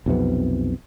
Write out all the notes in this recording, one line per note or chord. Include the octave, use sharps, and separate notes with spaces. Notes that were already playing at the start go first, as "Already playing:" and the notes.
B1 F2 C3 B3